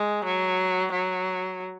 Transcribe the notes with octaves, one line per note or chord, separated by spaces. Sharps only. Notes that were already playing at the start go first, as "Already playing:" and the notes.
Already playing: G#3
F#3
F#3